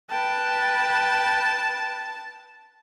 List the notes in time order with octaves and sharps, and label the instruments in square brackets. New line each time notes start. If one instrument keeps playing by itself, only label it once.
[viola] B4 G5 [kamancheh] A5